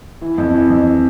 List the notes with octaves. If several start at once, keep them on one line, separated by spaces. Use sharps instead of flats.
E3
F2
E3
F2